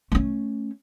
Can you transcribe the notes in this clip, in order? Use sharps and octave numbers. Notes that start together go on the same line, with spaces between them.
A3 C#4